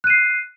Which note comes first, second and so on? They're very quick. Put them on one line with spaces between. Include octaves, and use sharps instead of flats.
F#6 D#7 C7